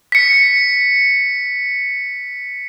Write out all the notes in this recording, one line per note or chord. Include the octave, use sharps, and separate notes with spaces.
B6 C#7